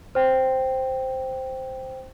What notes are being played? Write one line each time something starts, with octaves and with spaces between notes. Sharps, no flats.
C5 G5